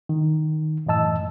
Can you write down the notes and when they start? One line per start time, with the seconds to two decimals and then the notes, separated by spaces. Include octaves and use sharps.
0.09 D#3
0.86 F#2 A2 E3 D#5 A5 E6